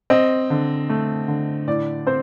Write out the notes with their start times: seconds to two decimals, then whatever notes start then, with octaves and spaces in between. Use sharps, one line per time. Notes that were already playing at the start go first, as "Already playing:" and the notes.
0.10 C4 D#5
0.50 D3
0.89 A3
1.28 D3
1.68 A2 D5
2.07 C4 C5